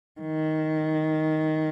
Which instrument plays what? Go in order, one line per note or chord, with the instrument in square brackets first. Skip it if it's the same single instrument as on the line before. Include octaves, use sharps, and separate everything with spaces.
[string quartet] D#3